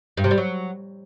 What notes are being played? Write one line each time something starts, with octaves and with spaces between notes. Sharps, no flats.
G2
C3
G3
F#3